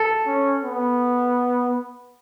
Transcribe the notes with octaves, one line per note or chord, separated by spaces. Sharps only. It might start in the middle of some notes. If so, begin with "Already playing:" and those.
Already playing: A4
C#4
B3